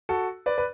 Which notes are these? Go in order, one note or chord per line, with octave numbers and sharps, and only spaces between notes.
F#4 A4
B4 D5
B4